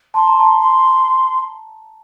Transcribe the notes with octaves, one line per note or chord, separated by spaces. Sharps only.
A5 C6
A#5
A5
C6